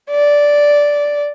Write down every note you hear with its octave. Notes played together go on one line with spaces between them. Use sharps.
D5